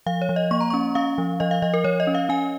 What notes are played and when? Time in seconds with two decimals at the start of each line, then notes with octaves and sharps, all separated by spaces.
0.06 F3 F5
0.22 C#5
0.29 F3
0.36 D#5
0.51 A#3 C#6
0.61 A#5
0.70 C#4 C#6
0.95 C#4 F5
1.18 F3
1.40 F3 D#5
1.51 F5
1.62 F3 D#5
1.74 A#4
1.84 F3 C#5
2.00 D#5
2.07 C#4
2.15 F5
2.29 C#4 G#5